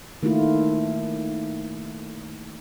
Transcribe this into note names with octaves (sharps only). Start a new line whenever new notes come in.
D#3 A3 A#3 E4 F4